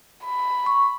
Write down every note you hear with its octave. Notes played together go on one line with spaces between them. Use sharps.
B5
C#6